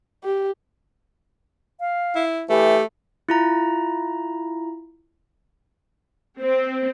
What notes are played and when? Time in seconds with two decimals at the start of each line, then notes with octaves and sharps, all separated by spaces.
0.24 G4
1.80 F5
2.15 E4
2.49 E3 A3 G4
3.29 E4 F4 A#5
6.40 C4